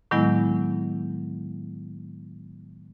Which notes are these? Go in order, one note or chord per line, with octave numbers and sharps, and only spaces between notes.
A2 D#3 F#3 G#3 B3 E4